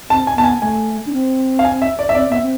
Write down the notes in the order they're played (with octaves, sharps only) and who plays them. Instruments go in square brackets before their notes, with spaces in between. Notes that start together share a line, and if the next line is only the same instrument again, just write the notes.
[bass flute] C4 [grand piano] A5
[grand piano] G#5
[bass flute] B3 [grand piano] A5
[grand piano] G#5
[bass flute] A3 [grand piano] G#5
[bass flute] D4
C4
[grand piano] F5
G#5
E5
D5
E5
[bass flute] C4 [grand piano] D5
[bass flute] B3 [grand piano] E5
[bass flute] C4